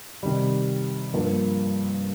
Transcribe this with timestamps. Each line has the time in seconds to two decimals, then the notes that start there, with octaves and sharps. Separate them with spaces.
0.23 C3 D#3 G3
1.14 G2 F3 A#3